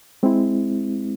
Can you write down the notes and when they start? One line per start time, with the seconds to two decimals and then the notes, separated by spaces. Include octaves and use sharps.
0.23 G#3 C4 E4